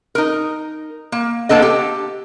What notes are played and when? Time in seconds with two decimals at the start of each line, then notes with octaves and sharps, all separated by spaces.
0.15 D#4 A#4
1.12 A#3
1.49 A#3 B3 D4 A4 D#5
1.62 G4